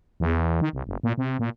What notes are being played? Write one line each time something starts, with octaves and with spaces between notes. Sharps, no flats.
E2
D#3
C2
F#1
A#2
C3
A#2